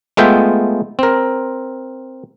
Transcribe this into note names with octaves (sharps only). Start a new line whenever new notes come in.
G#3 A3 B3 F4 E5 G5
C4 A#4